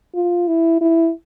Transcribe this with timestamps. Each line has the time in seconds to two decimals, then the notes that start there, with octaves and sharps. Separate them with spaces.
0.15 F4
0.48 E4
0.81 E4